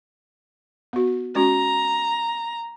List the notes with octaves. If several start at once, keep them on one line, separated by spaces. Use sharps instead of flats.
B3 F#4
G#3 C#4 F#4 A#5